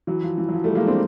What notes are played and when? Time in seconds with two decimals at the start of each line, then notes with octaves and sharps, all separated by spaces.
0.07 E3 F#3
0.23 F3
0.38 E3
0.49 F#3
0.53 F3
0.64 G3 A3
0.75 G#3 A#3
0.87 C4 D4